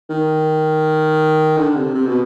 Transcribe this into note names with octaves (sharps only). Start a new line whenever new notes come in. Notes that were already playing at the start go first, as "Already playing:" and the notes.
D#3
D3
C3
C3
B2